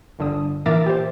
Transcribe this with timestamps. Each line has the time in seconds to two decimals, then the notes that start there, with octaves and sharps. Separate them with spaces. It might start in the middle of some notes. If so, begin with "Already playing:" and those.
0.19 G1 D3 D#6
0.66 A#2 E3 A#4 E5 D6 A6
0.86 G4 C5